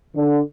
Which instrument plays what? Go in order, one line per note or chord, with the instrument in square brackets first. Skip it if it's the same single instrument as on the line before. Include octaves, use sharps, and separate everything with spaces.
[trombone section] D3